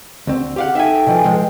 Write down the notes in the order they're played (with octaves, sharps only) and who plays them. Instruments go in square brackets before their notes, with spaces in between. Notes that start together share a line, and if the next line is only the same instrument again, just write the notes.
[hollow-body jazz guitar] D2 C4
G4 F5 F#5
[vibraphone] D#4 [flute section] A4 G5 [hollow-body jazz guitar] E5 G#5
[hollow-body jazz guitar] B2 F3 [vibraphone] B4 G#5
[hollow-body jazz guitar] F3 G#3 [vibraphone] B4